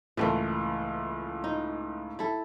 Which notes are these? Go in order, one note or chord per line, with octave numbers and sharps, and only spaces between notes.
C#2 A2 E3 A3 A#3
D#4
E4 A4